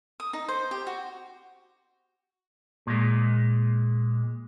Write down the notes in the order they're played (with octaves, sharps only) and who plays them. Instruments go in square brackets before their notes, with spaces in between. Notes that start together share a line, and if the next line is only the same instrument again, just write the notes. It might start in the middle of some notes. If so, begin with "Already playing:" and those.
[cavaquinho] D#6
D#4
C5
G4
F#4
[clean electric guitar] A#2 G#3